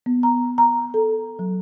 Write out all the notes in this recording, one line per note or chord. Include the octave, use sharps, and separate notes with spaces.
B3
A#5
A#5
A4
F#3